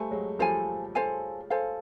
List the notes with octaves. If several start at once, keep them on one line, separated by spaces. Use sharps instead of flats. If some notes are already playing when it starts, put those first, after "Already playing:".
Already playing: G3 A3 A4 C5 F5 G#5
F#3 G#3
F3 G3 A4 C5 F5 G#5
A4 C5 F5 G#5
A4 C5 F5 G#5